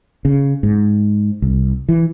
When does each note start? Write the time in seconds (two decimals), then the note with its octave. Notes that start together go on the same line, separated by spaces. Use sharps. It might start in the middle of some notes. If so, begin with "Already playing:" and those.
0.25 C#3
0.63 G#2
1.42 C2
1.89 E3